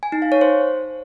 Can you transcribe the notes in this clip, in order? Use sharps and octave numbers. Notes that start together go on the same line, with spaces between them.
G#5
D#4
F5
C#5
C5